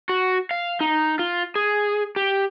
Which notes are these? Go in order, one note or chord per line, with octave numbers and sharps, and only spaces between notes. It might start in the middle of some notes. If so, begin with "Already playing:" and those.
F#4
F5
D#4
F4
G#4
G4